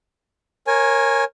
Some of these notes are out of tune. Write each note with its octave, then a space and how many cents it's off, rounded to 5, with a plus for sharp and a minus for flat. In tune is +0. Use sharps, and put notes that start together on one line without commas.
A#4 +0 C#5 -25 G#5 +0